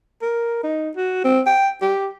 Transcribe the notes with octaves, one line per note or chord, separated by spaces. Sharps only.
A#4
D#4
F#4
C4
G5
G4